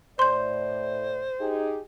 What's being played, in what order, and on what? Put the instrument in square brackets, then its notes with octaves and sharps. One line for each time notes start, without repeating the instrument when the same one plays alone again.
[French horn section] A2 D5 [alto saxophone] C5 [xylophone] C6 G6
[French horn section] D#4 G4 G#4